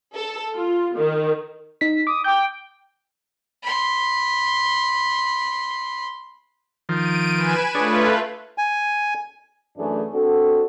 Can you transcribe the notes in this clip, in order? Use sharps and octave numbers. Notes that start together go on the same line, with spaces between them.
A4
F4
D#3
D#4 B6
D6 D#6
G5 D6 G6
B5 C6
D#3 F3 D7 D#7
B4 G#5 E7
A3 D4 F4 G#4 B4 C#5
G#5
F#2 E3 A3 D4 G#4
C4 D4 F#4 A4